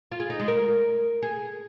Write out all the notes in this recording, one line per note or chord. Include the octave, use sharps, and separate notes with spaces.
F4
G#4
D#4
G#3
A#4
G#4